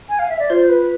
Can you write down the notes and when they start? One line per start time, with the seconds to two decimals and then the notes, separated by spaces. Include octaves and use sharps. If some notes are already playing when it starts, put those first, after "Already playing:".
0.09 G#5
0.19 F5
0.29 E5
0.39 D5
0.50 F4 C5
0.69 B4